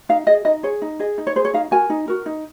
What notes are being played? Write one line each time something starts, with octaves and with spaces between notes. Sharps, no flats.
D#4 F5
G#4 D#5
D#4 D#5
G#4 C#5
D#4
G#4 D#5
D#4
C#5
G#4 C5
C#5
D#4 F5
F#4 A#4 G#5
D#4
F#4 A#4
D#4